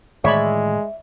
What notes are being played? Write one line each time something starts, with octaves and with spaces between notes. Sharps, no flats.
A2 D#3 E3 G#3 C#5 D5 E5 B5